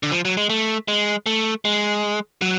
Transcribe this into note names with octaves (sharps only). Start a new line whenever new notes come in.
D3
F3
F#3
G#3
A3
G#3
A3
G#3
F#3